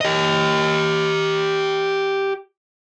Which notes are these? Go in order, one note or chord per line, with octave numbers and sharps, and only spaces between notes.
G4 D#5